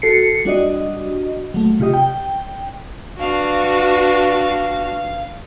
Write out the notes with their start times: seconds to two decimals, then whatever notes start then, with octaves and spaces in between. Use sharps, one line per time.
0.02 F#4 A4 C7 C#7
0.45 G3 D4 F#4 D5 D#5
1.54 F#3 A3
1.80 C3 F4 G4 D#5
1.94 G5
3.19 D4 F#4 B4 F5